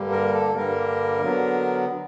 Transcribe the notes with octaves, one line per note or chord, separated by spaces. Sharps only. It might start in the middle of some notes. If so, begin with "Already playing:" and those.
Already playing: G2 D3 G3 A#3
A#4
A4
G2 D3 G3 A#3 A#4
D3 F#3 B3